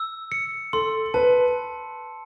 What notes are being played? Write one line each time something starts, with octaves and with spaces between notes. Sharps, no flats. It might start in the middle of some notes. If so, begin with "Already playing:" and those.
Already playing: E6
C#7
A4 C6
B4 A5